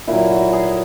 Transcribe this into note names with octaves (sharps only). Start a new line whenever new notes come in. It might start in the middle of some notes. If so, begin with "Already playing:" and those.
A#2 F#3 E4
F#4
G#4